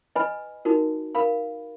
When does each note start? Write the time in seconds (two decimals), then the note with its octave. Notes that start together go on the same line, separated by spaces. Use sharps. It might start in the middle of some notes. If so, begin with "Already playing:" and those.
0.16 B4 D#5 G#5 B5
0.65 D#4 F#4 A#4
1.15 A#4 F5 B5